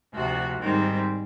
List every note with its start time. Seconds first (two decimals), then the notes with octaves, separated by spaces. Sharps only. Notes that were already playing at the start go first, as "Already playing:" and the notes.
0.14 D2 C3 F3 F#4
0.60 G#2 D#3 G3 C4